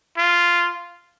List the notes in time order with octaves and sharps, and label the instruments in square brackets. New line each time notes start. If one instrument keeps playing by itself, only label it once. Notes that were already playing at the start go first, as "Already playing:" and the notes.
[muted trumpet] F4